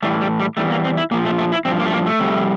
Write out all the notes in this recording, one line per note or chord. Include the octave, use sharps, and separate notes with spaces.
A2 E3 G3 A3
G3
G3
E2 E3 G3 A3
A#3
C4
E4
A#2 F3 A#3
A3
A3
E4
G2 F3 C4
A#3
A3
A#3
A3
F2 C3 G3